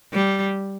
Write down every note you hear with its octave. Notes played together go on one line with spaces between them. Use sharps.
G3